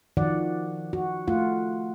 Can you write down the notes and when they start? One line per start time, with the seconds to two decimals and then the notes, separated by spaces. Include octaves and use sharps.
0.17 D#3 F3 F#4 D5 F#5
0.93 F#4
1.28 A3 F4 F#5